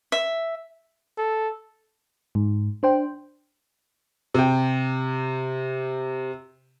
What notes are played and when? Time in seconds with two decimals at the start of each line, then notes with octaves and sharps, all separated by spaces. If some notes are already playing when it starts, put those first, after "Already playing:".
0.12 E5
1.18 A4
2.35 G#2
2.83 D4 C5 G5
4.34 C3 G5